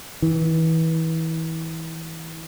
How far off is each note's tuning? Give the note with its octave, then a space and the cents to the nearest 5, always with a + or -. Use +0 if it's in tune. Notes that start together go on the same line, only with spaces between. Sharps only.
E3 -30